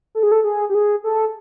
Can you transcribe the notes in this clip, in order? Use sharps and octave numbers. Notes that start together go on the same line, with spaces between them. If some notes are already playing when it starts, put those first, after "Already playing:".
A4
G#4
A4
G#4
G4
G#4
A4